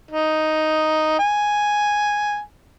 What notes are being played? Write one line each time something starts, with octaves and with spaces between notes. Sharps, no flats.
D#4
G#5